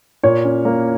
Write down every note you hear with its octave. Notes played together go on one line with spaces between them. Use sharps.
A#2 C#5
C#4
A#3